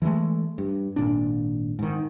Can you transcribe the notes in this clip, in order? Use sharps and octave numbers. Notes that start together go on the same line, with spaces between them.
E3 F#3 G#3 A3
G2
G#1 A#2 D4
G#2 D#3